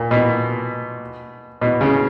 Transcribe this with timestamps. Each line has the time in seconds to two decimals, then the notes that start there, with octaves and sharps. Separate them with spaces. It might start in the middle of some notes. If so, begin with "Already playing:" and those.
Already playing: A#2
0.11 B2
1.61 B2
1.81 C#3